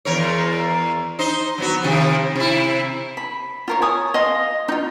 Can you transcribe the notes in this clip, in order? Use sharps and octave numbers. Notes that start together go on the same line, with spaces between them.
E2 A#4 C#5
D#4 C5 D#5
F#3 B3 F#4
C3 D#3 F3
C3 E4
B5
F4 A#4 C#5
C#5 G#5 C#6 D#6
D#5 F5 C6
D#4 F4